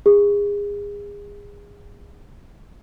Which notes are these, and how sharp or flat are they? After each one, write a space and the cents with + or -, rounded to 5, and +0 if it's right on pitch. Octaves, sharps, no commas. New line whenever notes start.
G#4 -30